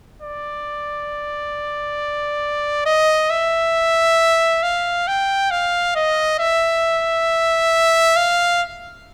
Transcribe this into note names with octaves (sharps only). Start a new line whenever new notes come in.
D5
D#5
E5
F5
G5
F5
D#5
E5
F5